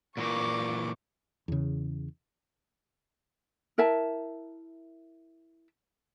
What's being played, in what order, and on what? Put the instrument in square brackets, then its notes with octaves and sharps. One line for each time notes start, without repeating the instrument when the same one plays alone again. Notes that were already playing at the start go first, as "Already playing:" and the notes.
[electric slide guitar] A#2 E3 A#4 [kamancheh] C#6 D6
[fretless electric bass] E2 C#3
[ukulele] E4 A#4 E5 A5